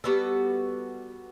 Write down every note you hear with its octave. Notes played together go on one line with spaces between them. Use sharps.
G3 B3 F#4 A4